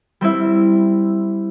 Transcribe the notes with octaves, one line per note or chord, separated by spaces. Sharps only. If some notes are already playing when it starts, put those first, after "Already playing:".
G3 C4 E4